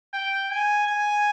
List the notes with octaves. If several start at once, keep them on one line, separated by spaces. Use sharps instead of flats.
G5
G#5
G#5